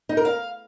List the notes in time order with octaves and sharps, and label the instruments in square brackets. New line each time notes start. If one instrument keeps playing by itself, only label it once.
[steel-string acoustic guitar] D#4
A#4
F5